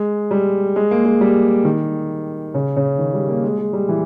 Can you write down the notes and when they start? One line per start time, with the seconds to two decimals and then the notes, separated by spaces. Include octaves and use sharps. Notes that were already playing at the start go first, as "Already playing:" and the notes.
Already playing: G#3
0.31 G3
0.76 G#3
0.91 A#3
1.06 G#3
1.21 G3
1.65 D#3
2.54 C#3
2.76 C#3
2.98 D#3
3.14 G3
3.29 A#3
3.44 G#3
3.59 G#3
3.73 G3
3.89 E3